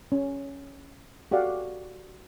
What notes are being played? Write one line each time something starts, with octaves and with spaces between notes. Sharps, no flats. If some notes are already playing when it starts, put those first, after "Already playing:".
C#4
F#4 G4 A4 D5 F5 F#5